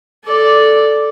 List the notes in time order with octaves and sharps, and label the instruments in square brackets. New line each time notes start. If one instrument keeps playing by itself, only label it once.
[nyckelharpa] A4 D5